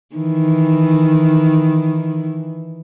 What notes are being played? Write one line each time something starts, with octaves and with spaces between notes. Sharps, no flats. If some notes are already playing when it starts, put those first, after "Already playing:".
D#3 E3